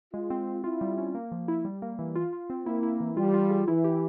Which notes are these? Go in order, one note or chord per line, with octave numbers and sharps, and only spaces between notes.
G#3 F4
C4
C4
E4 F4
G3
C#4
A#3
F3
E4
G3
A#3
E3
F4
F4
C4
A#3 E4
E4
E3
G3 F4
F4
G#4
E3 E4
G4